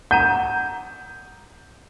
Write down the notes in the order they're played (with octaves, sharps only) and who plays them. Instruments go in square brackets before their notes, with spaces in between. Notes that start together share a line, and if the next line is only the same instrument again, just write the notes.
[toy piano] F#5 A5 A#5 [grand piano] G6